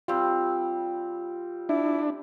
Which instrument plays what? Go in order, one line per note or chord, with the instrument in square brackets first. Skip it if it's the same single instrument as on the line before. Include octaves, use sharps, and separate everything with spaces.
[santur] G3 C4 [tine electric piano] F4
[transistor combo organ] D4 [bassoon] E4